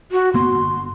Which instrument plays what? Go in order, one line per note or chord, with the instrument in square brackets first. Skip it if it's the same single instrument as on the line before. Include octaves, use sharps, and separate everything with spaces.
[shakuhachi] F#4
[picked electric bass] F#1 A#3 B3 [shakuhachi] C6
[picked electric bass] G1